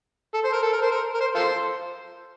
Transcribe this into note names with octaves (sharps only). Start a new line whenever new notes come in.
A4
C5
A#4
A4
A#4
C5
A#4
A#4
C5
F4 A4 C5